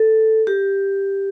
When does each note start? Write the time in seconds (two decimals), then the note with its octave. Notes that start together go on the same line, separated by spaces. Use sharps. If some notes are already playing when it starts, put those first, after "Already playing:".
Already playing: A4
0.47 G4